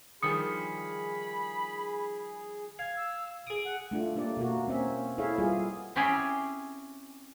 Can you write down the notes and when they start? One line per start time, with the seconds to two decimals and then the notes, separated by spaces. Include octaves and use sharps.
0.23 D#3 F3 G3 G#4 B5 D#6 C#7
2.79 F5 G#6
2.96 E6
3.47 G#4 D#6 D7
3.65 F#5
3.91 A3 D4 F4
4.16 A#3 D4 G4 D5
4.37 B2 A#3 F#4
4.67 A#3 C4 C#4 E5
5.18 E4 G#4 A4 C#5 E5 F5
5.38 G3 B3 F4 G#4 D5
5.96 C4 C#4 E4 G4 G#4